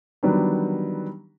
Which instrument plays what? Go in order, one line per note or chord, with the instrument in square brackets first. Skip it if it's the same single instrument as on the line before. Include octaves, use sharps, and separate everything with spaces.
[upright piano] D#3 E3 F#3 G3 B3 D4